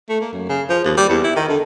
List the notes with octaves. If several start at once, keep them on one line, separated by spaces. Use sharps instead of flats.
A3
A#3
F#2
C#3
F3
D#2
G3
E2
E4
D#3
D3